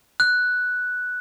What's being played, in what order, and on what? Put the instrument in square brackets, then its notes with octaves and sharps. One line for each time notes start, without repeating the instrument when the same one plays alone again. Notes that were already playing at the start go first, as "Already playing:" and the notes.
[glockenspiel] F#6